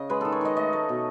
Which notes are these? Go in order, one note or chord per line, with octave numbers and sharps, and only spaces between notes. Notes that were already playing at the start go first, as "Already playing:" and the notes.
Already playing: C#3 D#5
G#3 B4
D#3 A4
C#5
D#3 D#5
A3 D#5
A3
B2